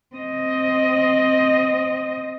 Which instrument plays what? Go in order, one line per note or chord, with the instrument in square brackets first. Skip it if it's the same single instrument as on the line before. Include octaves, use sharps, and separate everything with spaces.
[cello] C4 D#5